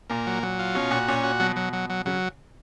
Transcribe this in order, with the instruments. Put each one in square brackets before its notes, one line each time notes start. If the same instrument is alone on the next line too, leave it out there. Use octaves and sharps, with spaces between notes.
[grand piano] A#2 [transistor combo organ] A#3
[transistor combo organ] F#3
F#3
F4
[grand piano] B2 [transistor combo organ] C#4
[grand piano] A#2 [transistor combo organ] F#4
[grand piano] A#2 [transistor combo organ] C#4
[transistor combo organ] F#4
[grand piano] B2 [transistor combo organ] F#3
[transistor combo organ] F#3
F#3
F#3
[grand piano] C#3 [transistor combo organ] F#3